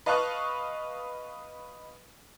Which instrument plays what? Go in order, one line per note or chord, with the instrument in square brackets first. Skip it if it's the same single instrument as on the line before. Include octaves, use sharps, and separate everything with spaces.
[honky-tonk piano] B4 D#5 F5 A5 C#6 F#6